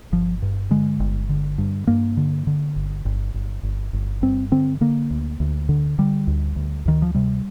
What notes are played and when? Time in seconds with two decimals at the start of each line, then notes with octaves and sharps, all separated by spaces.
0.12 G1 F3
0.42 G2
0.71 D3 G#3
1.00 G1
1.29 D3
1.58 G2
1.87 G2 A#3
2.17 D3
2.47 D3
2.76 G1
3.05 G1
3.34 G1
3.63 G1
3.93 G1
4.22 G2 C4
4.51 D3 C4
4.81 D3 A#3
5.11 D2
5.40 D2
5.69 D3
5.98 D3 G3
6.27 D2
6.56 D2
6.85 D2 D#3
7.02 F3
7.14 C3 G3